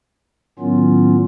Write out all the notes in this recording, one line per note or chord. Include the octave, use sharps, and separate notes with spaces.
A2 D#3 F#3 B3 C#4 F4